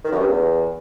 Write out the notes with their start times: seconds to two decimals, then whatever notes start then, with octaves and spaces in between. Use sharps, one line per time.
0.04 D#3
0.12 F#2
0.20 G2
0.27 E2